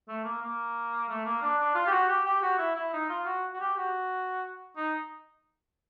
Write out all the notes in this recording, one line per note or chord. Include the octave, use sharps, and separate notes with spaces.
A3
A#3
A#3
A3
A#3
D4
D4
F4
G4
F#4
G4
G4
F#4
E4
E4
D#4
F4
F#4
F#4
G4
F#4
D#4